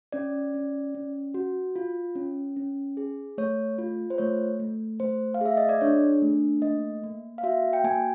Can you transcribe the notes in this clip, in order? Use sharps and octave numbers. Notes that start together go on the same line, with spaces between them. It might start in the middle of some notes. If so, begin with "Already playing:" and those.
C#4 D5
C#4
C#4
F#4
F4
C#4
C#4
G#4
A3 C#5
F4
C5
A3 C#5
A3
A3 C5
F5
G#4 E5
D#5
D5
D4 C#5
A3
A#3 D#5
A#3
F5
F#4 E5
G5
A#3 G#5